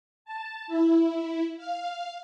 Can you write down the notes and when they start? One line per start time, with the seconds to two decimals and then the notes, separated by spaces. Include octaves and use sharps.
0.25 A5
0.67 E4
1.57 F5